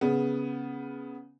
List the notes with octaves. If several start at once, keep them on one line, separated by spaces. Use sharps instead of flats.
C#3 B3